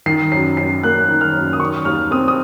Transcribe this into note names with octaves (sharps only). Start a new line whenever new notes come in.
D#3 C7
F#2 C7
F#2 C7
A#3 F#6
D#3
F6
F#2
D#6
D#3 C#6
D#2 F6
C4 D#6
D#6